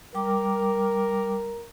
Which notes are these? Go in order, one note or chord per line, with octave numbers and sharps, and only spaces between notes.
G3 A#4 G5 D6